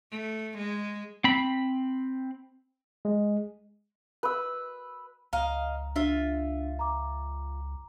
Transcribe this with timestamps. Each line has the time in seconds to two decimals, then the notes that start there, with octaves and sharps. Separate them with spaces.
0.11 A3
0.58 G#3
1.24 C4 B5
3.05 G#3
4.23 B4 E6
5.33 C#2 D#5 F5 A#5
5.96 D4 F4 E5
6.79 A#5 D6